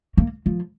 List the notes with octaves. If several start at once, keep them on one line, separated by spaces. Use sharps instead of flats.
A#3
F3